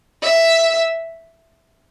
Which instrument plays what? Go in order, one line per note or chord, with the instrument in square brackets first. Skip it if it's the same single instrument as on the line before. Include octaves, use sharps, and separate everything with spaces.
[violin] E5